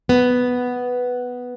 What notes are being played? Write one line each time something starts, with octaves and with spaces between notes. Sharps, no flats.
B3